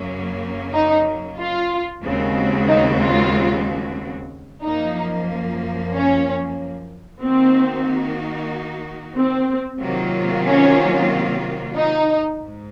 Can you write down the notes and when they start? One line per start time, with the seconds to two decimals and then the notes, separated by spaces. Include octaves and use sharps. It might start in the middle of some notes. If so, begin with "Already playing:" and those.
Already playing: F#2 C#3 F#3 A#3 C#4
0.74 D#4
1.38 F4
2.03 D#2 C#3 G#3 C4 F#4
2.68 D#4
3.01 F4
4.63 F#2 F3 A#3 D#4
5.92 C#4
7.22 D#3 A#3 C4 D#4 F#4
9.17 C4
9.81 C3 D#3 F#3 A#3 F4
10.46 C#4
11.76 D#4
12.40 G#2